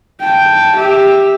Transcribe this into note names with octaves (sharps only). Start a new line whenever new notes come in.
G5 A5
G4 E5